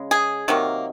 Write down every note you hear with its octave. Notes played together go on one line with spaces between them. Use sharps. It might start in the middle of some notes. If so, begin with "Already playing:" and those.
Already playing: C#3 G#3
G#4
C3 D#3 F#3 A#3